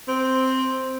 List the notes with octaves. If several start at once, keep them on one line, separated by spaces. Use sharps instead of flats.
C4